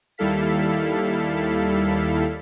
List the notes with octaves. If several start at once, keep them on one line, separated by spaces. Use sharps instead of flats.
D#2 G3 E4 A4 F5 B6